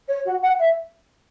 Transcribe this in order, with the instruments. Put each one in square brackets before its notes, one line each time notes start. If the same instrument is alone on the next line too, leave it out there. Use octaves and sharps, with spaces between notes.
[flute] C#5
F#4
F#5
E5